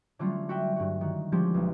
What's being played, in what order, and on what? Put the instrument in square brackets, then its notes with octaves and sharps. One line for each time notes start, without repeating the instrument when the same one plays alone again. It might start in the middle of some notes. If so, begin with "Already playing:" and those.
[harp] D3 F#3 G3 A3 C#4 F4
F#4 E5 G5
G2 F#4
D#3 F#4
D3 F3 G3 G#3 C#4 G4
B1 E4